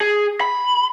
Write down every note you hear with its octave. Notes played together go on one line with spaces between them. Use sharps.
G#4
B5